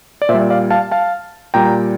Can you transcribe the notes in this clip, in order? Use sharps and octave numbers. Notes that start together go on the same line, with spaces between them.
D5
A#2 C5 E5
G3
D5 F5
F5 A5
F5 A5
A#2 G3 G5 A#5